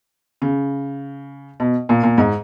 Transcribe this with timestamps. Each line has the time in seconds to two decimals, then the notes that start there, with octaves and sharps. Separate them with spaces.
0.42 C#3
1.60 B2
1.89 A#2
2.03 A#2
2.18 G#2